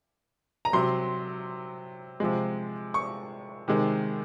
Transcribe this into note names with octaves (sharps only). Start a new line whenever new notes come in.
A#5
C3 F#3 C6
C3 F3 G#3
C#6
C3 D#3 G#3